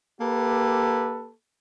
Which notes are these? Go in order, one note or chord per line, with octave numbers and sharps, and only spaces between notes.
A#3 G4 A4 B4